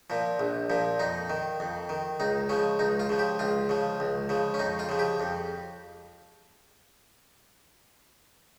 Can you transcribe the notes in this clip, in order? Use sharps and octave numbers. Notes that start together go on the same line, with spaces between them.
A#2 F3
A#1
A#2 F3
F2 D#4
D#3
F2
D#3
C#2 D#4
C#3 F3 C#4
C#2 D#4
F4
C#3 F3
G4
C#2 F4
C#3 F3
C#2
C#3 F3
C#4
F2 D#4
F4
C#3 F3
G4
F2